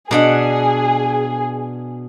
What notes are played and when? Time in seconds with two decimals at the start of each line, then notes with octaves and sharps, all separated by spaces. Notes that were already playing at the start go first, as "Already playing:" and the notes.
0.11 B2 D4 G#4 F#5